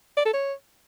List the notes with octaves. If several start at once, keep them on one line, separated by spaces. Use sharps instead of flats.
D5
A4
C#5